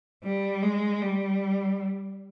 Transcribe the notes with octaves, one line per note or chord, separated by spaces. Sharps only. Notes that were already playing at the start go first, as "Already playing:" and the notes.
G3
G#3
G3